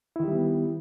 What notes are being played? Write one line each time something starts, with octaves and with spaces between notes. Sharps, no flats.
D#3 G3 B3 E4 G4